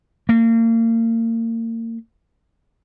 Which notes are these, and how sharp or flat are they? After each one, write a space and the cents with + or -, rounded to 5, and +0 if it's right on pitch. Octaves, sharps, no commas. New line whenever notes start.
A#3 -35